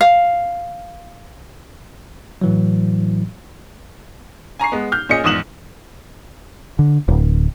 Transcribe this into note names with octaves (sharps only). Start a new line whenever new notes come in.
F5
A2 E3 F#3
G#5 A#5 C#6 C7
G#3 B3
F6 G6
A#2 C#4 G#4 D#5 C#7
A#1 E2 G#2 D#6 E7 F#7
D3
D1